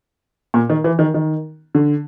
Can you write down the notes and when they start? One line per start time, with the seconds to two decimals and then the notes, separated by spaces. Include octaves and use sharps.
0.54 A#2
0.70 D#3
0.84 E3
0.99 D#3
1.14 D#3
1.75 D3